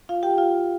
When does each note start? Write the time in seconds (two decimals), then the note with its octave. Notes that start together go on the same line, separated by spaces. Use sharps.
0.09 F4 F5
0.23 G4 G5
0.38 F4 F5